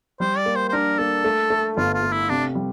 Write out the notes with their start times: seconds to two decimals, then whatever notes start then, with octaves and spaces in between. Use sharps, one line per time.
0.20 G3 C5
0.37 D5
0.46 A#3
0.55 C5
0.69 C5
0.72 D4 A#4
0.98 A#3 A4
1.24 A3
1.50 A3
1.77 G1 F4
1.94 F4
2.03 A3
2.12 E4
2.29 C3 D4
2.55 G3